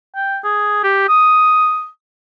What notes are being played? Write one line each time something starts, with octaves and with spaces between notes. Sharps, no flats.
G5
G#4
G4
D#6